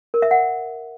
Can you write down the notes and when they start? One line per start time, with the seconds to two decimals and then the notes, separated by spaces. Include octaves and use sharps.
0.14 A#4
0.22 E5
0.31 F#5